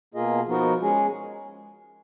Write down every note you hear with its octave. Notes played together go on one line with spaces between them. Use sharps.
B2 A#3 F4 G#4 D#5
F3 B3 D#4 F#4 A#4
G#3 C#4 G#4